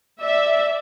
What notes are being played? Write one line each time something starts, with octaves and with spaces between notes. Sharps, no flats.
D5 E5